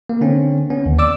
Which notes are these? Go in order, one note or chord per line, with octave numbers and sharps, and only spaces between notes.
A#3
D3 C4 C#4
B3 C#4
D#2
D5 D6 E6